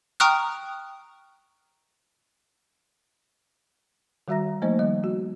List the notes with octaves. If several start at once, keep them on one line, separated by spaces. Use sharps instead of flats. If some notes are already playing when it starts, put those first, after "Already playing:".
G5 A#5 C#6 D#6 F6 F#6
D#3 G3 F#4 E5 A#5 A#6
F3 A3 A#3 D#4 C5 D#5
D#3 G3 D#5
F#4